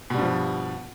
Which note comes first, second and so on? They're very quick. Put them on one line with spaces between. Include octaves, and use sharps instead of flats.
B2 G3 G2 F3